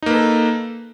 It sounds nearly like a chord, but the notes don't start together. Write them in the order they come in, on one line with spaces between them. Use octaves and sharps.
D#4 A#3 B4 A4